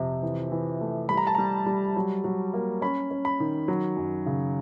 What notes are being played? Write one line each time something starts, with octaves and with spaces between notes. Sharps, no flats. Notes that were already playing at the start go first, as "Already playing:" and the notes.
Already playing: F2 C3
E3
E3
A3
G3 B5
A#5
A5
G3 A#5
G3
F#3
F#3
A#3
C#4 B5
C#4
B5
D#3
F#3
F#2
C#3